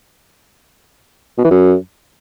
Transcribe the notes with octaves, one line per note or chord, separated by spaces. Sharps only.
B2
E3
F#2